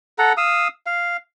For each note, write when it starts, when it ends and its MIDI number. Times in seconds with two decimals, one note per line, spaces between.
0.19 0.33 69
0.19 0.33 78
0.19 0.33 82
0.37 0.68 77
0.37 0.68 87
0.37 0.68 88
0.86 1.17 77